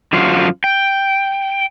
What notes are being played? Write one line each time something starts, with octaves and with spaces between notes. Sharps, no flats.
F#2 D3 F3 F4 F#4
G5